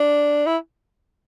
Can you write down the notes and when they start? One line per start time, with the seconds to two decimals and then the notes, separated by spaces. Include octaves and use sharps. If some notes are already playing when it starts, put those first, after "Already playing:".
Already playing: D4
0.47 E4